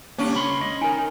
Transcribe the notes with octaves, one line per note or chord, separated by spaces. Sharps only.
A#3 C#4 D4 G4
C#2 B5 C6
D#5
D#4 A#4 G#5